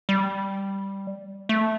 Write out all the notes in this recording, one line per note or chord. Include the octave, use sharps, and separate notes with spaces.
G3
A3